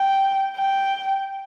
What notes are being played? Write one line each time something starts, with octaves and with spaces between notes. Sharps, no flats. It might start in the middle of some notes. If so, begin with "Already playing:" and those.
Already playing: G5
G5